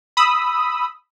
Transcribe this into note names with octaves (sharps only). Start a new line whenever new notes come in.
B5 D#6 E6